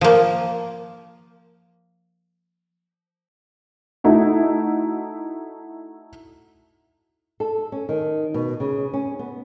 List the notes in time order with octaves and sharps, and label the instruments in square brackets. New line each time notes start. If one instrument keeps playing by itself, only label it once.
[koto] F3 A#3
[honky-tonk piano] A3 D#4 E4 F#4
[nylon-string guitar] A4
C#4
D#3
B2
C#3
C#4
B3